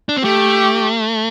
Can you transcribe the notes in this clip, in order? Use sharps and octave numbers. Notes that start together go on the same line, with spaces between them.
D4
C4
A3 G4